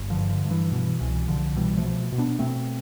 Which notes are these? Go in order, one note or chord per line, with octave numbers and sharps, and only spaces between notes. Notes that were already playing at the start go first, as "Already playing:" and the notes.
Already playing: G1
D3 F3
G2
D3
G2
E3
B2 E3
C2 E3
C2 D3 F3
B2 E3 G3
F3 A3
B2
B2
B3 D4
B2 A3 C4